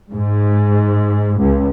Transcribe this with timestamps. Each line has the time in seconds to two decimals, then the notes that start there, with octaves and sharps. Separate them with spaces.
0.11 G#2
1.39 C#2